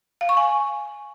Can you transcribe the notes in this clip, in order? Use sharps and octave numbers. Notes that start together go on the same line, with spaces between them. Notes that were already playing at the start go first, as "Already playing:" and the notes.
F5
C#6
G#5